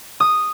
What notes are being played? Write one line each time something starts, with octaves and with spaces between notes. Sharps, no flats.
D#6